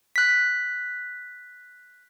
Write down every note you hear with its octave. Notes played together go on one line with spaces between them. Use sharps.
F#6 B6